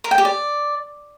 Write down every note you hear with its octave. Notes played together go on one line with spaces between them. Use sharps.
A#4
G5
G4
D5